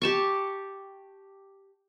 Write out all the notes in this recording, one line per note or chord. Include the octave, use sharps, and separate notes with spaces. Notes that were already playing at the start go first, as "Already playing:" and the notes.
G4 A5 C#6